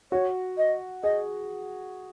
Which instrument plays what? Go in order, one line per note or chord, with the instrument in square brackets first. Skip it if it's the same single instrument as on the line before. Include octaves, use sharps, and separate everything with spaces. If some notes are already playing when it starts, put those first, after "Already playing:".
[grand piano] F#4 [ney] C#5
[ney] D#5
[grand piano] G#4 [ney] D#5